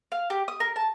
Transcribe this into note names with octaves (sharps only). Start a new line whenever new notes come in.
F5
G4
D#6
A#4
A5